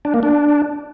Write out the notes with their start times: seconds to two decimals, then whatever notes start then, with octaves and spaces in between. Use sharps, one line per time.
0.05 D4
0.14 A#3
0.23 D4